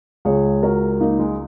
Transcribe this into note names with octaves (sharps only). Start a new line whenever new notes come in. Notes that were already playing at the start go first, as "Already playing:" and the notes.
C#2 C#3 G#4 C#5
F#4 A#4
A#3 D#4
G#3